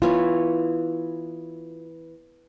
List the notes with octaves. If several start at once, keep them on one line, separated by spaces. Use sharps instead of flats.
E3 B3 F4 C#5